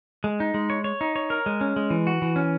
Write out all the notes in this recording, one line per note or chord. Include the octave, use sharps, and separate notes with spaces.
G#3
D#4
G#3
C#5
C#5
D#4
C#5
A#4
G#3
C#4
G#3
E3
F#4
E3
C#4